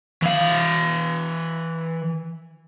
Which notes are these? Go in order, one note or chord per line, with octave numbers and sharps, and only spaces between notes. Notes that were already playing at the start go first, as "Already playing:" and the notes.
E3 F5